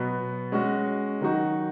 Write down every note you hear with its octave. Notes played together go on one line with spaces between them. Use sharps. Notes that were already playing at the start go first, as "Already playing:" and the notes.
Already playing: B2 F#3 B3
G#3 C#4 F#4
D#3 F#3 D#4 F#4